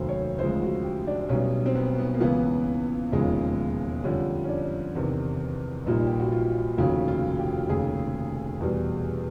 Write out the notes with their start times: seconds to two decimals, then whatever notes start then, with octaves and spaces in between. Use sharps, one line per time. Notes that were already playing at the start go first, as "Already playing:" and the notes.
Already playing: F1 D#2 D#3 F#3 C5
0.09 C#5
0.38 D2 C#3 F3 G#3 C5
0.62 F#4
0.84 G4
1.07 D4
1.29 B1 B2 G3 C#4
1.66 C4
1.75 B3
1.98 B3
2.14 A#3
2.21 C#2 C#3 E3 B3
3.12 E1 D#2 C#3 F3 G#3
4.04 F2 D3 G3 C#4
4.44 C#4
4.49 D4
4.95 E2 C3 D#3
5.86 A#1 A#2 G3 D#4
6.07 G4
6.19 F#4
6.32 F4
6.77 F1 D#2 C#3 F3 F#4
7.08 F4
7.39 G4
7.69 F1 D#2 C#3 G#4
8.61 E2 B2 G3